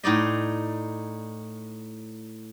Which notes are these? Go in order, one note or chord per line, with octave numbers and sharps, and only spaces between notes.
A2 D#4 D5 D#5